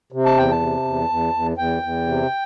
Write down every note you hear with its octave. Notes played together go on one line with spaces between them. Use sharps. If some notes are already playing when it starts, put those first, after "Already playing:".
C3
A5
E2 G5
A5
C3
E2
E2
E2
E2 G5
E2
C3